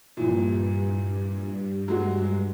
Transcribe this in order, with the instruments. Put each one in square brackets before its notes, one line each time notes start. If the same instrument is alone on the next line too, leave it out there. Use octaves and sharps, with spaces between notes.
[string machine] G2 [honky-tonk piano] A#2 E3 F3
[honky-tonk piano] F#3 G#3 F#4